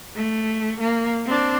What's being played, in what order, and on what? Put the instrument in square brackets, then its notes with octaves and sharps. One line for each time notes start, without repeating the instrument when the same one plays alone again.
[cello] A3
A#3
C4 D4